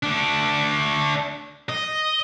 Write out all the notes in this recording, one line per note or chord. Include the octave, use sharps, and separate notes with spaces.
A3 D4
D#5